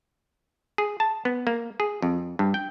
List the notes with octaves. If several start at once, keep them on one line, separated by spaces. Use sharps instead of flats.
G#4
A5
B3
A#3
G#4
F2
G2
G5